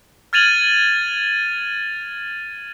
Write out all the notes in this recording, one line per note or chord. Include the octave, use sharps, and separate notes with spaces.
F6 G#6 A6 D#7 F7 F#7